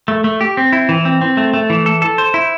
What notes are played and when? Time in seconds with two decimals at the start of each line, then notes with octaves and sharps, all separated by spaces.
0.08 A3
0.24 A3
0.41 G4
0.57 C4
0.73 E4
0.89 E3
1.05 C4
1.21 C4
1.37 A3
1.54 A3
1.70 E3
1.86 A4
2.02 A4
2.18 C5
2.34 E4